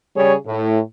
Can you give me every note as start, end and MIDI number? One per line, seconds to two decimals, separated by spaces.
0.16 0.35 49
0.16 0.35 55
0.16 0.35 68
0.16 0.35 73
0.47 0.79 45